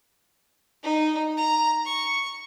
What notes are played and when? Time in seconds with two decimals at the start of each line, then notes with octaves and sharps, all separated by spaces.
0.83 D#4
1.37 A#5
1.86 C#6